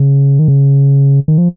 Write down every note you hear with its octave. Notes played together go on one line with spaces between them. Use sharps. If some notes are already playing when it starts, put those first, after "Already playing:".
Already playing: C#3
D#3
C#3
D#3
F3